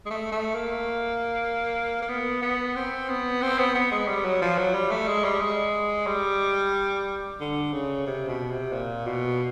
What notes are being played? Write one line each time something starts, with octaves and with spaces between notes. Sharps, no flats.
G#3
A3
A3
A#3
A#3
B3
B3
C4
B3
C4
B3
B3
G#3
G3
F#3
F3
F#3
G3
A3
G#3
G3
G#3
G3
D3
C#3
C3
B2
C3
A#2
B2